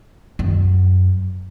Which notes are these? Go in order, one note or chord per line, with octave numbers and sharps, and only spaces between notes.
F#2